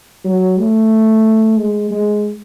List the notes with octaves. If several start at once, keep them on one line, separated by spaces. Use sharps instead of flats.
F#3
A3
G#3
G#3